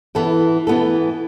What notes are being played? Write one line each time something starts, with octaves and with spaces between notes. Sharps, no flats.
E3 B3 E4 A4
E3 B3 E4 A4